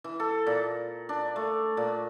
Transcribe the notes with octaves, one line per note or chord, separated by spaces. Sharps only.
E3
A4
A#2
D4
A3
A#2